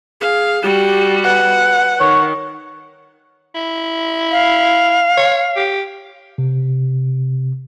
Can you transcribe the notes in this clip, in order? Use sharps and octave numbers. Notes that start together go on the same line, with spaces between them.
G#4 F5
G3 F#4 G4
B4 F#5
D#3 C#5
E4
F5
C#5
G4
C3